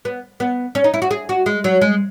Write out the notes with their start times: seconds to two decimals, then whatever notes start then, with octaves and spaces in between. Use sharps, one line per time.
0.05 B3
0.40 B3
0.75 C#4
0.84 D#4
0.94 E4
1.02 F#4
1.11 G#4
1.29 F#4
1.46 G#3
1.64 F#3
1.81 G#3